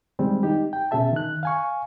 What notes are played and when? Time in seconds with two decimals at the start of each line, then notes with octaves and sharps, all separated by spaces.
0.19 D#3 G3 G#3 C4
0.43 D#4 G4
0.73 G5
0.91 B2 C#4 G#4 E5 A5
1.12 D#3 F#6
1.43 F5 G#5 C#6